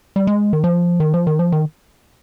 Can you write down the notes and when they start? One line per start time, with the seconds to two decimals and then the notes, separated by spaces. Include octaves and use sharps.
0.16 G3
0.27 G#3
0.53 D#3
0.64 F3
1.00 D#3
1.14 F3
1.27 D#3
1.39 F3
1.52 D#3